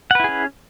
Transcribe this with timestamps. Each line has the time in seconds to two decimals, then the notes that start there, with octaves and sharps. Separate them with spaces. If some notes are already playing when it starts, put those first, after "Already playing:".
0.11 F#5
0.15 B4
0.20 E4
0.24 G#4
0.29 C#4